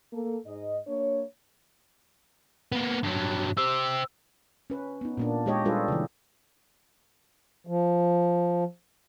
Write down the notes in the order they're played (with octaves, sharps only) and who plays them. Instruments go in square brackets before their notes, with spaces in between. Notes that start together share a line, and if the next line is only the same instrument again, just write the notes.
[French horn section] A#3 A4
G#2 D#5
A#3 D4 C#5
[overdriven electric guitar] A#3 B3
G2 F#3
[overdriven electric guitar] C4 G4 [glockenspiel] E6
[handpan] C#4 B4
B3 D#4
A#2 A#3 D4
G#3 D#4 G4 C#5 D#5
G3 D4 F4 G#4 A4 B4
C#3 E3
[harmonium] F3